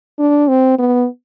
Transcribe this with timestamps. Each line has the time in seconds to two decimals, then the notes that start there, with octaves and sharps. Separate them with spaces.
0.19 D4
0.48 C4
0.79 B3